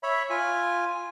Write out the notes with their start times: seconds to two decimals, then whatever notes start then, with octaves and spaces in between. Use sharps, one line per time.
0.03 C#5 E5 B5
0.30 F4 G#5